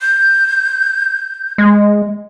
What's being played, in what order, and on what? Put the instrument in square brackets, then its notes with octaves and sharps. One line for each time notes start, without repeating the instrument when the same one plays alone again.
[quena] G6
[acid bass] G#3